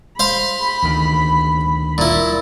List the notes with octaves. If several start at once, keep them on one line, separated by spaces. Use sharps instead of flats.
C5 F5 B5 C6
D2 D#3
A#2 E4